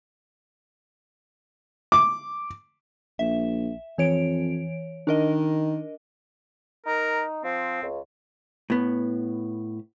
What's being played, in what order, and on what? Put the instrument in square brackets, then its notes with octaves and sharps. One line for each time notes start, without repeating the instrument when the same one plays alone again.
[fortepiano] D6
[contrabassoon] A#1 [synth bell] E5
[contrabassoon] F2 [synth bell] E3 C#5 D7
[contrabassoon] D#3 [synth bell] D4 A#4 D#5
[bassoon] D#4 [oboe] A#4
[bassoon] F3 [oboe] C4
[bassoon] C#2
[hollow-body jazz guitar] A2 B3